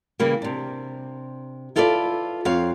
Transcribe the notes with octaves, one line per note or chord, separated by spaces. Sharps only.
C#3 E3 G3 A#3
C3 D4
E4 F4 A4 B4 C5 D5
F2 C#5 F5